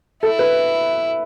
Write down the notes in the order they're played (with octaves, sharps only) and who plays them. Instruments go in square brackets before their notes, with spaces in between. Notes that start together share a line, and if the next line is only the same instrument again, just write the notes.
[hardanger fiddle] E4 [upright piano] A4
[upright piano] B4